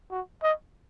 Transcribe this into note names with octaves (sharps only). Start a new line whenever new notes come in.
F#4
D#5